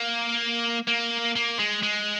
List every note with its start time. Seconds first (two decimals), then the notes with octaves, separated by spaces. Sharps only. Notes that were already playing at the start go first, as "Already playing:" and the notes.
Already playing: A#3
0.87 A#3
1.36 A#3
1.59 G#3
1.83 G#3